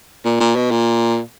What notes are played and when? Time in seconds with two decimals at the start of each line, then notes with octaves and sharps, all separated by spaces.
0.25 A#2
0.40 A#2
0.56 B2
0.71 A#2